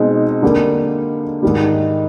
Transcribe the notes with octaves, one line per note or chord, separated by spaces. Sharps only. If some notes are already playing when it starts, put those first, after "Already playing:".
Already playing: B2 G#3 C4 D#4
D3 G3 A#3
G#2 D#3 G3